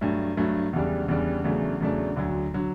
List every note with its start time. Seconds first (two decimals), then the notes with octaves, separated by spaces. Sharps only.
0.01 G2 F#3 A3
0.37 G2 F#3 A3
0.73 E2 C#3 G3 D4
1.08 E2 C#3 G3 D4
1.44 E2 C#3 F#3 A3 D4
1.80 E2 C#3 F#3 A3 D4
2.16 D2 D3 F#3
2.54 D3 F#3